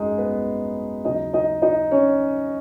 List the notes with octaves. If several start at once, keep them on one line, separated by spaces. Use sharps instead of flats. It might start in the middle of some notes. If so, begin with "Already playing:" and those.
Already playing: G#1 F#2 F#3 G#3 D#4 G#4
B3 B4
D#2 C#3 F#3 D#4 D#5
D#4 D#5
D#4 D#5
C#4 C#5